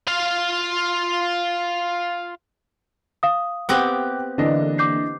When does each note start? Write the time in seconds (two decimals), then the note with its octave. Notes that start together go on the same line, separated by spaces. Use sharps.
0.08 F4 F5
3.23 F5 D#6
3.69 B3 C4 G4 F#6 A#6
4.38 D3 E3 A#3 D4 E4 D#5
4.78 D6 G6 C7